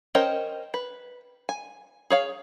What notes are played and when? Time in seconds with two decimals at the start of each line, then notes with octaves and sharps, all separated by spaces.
0.15 C#4 A#4 C5 D#5 G5
0.74 B4
1.49 G#5
2.10 G#4 C#5 F5